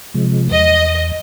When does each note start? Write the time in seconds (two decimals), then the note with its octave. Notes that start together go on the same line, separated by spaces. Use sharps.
0.14 C3 F3 G#3
0.51 E2 D#5